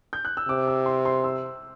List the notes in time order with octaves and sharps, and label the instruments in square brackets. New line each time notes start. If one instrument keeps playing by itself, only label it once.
[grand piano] G6
F#6
E6
[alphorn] C3 [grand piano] D6
[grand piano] E6
C6
C6
E6